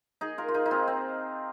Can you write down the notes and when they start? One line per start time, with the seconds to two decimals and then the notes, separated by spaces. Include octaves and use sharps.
0.21 D#4 G#4
0.38 F4 A#4
0.48 F4
0.54 D#4 G#4
0.66 D#4
0.71 C4 F4
0.88 C4